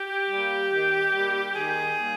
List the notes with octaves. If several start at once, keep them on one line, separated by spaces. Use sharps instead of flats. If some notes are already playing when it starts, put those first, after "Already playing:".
Already playing: G4
G3 A#3
D#3
G3 A#3
D#3 G#4
G3 A#3